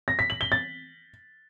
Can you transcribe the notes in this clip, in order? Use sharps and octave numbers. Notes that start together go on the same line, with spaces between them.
A#6
B6
F#7
G7
A6